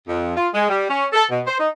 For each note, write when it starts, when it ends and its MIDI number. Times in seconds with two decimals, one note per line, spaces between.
0.08 0.33 41
0.37 0.48 65
0.54 0.66 56
0.69 0.88 55
0.90 1.05 61
1.13 1.25 69
1.31 1.41 47
1.47 1.57 72
1.60 1.68 63